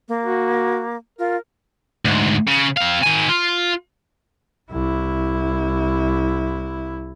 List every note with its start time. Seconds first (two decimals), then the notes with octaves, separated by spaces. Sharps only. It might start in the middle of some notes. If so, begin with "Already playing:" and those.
0.08 A#3
0.24 F#4
1.19 F4 A#4
2.05 D2 G#2
2.48 C#3
2.77 C4 F5
3.03 D#3 G#5
3.29 F4
4.71 C2 E4